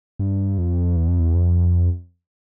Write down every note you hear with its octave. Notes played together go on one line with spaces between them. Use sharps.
G2
F2
E2
F2
E2
F2